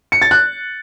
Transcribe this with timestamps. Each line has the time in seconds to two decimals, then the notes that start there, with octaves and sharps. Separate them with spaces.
0.12 C#7
0.22 A6
0.31 F#6